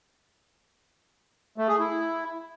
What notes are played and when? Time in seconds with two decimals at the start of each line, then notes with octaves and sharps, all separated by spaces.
1.58 A3
1.68 G#4
1.79 E4